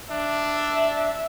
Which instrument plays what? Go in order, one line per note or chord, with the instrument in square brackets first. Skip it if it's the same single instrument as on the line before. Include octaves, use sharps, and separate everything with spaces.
[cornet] D4 [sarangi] E5